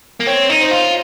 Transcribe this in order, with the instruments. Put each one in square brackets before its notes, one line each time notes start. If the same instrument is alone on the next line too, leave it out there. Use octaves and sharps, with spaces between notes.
[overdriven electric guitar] A#3
[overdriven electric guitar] C4 [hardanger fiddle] C#5
[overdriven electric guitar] D#4
[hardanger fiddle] C5
[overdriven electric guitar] F4